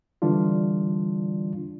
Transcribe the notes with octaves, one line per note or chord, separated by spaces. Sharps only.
D3 E3 G3 D4 F4